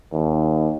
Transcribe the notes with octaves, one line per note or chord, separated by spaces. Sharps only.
D#2